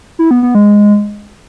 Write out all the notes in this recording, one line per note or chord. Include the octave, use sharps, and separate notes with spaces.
E4
B3
B3
G#3